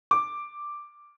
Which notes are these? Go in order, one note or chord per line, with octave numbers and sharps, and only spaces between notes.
D6